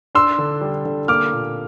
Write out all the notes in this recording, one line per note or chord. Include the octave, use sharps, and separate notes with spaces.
D4 C6 E6
D3
G3
D3
A#3 D6 F6
A#2